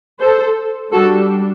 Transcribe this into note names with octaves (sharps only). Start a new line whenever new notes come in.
A4 C5
G3 D4 F#4 A4